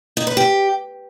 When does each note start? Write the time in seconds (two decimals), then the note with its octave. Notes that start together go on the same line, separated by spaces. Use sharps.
0.17 D#4
0.27 B4
0.37 G4